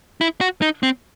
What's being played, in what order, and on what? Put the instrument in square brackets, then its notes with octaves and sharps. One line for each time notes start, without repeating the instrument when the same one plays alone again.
[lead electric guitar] E4
F#4
D#4
C4